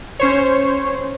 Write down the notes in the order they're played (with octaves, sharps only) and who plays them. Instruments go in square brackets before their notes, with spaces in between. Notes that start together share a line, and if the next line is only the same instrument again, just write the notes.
[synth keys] C#4 C5 C#5